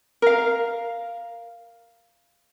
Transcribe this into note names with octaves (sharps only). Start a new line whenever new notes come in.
A#4 F5